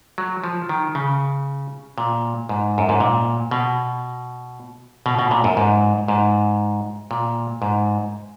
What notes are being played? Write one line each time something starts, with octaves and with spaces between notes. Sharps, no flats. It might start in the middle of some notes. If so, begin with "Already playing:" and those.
F#3
F3
D#3
C#3
A#2
G#2
F#2
G#2
A#2
B2
B2
B2
A#2
F#2
G#2
G#2
A#2
G#2